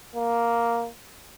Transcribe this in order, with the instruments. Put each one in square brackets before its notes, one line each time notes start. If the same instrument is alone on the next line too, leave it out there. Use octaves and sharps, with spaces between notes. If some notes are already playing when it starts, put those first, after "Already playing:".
[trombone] A#3